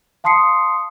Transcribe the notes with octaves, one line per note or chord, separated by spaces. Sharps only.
F5 A5 C6 D#6 C7 C#7